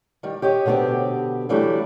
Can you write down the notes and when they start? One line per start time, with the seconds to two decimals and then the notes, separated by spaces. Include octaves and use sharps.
0.23 D#3 G3
0.42 G4 C#5 D#5
0.66 B2 D3 B3 C4 G4
1.49 E3 F#3 G3 A3 D4 E4